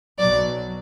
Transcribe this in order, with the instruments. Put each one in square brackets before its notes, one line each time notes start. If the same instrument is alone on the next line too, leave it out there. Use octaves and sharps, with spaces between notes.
[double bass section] B1 B2 F#3 [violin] D5